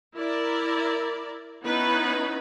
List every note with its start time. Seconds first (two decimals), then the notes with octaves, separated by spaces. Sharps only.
0.17 E4 A#4 D5
1.64 B3 C#4 D#4 E4 B4